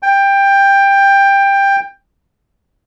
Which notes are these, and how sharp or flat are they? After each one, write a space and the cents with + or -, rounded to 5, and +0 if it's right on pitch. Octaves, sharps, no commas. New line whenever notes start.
G5 +15